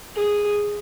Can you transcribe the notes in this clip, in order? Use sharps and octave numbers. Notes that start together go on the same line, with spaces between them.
G#4